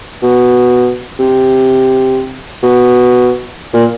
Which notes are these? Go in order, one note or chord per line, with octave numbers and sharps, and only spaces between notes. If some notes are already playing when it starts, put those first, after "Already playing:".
B2
C3
B2
A#2